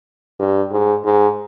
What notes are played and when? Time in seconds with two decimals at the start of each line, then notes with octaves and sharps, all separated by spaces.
0.39 G2
0.71 G#2
1.05 G#2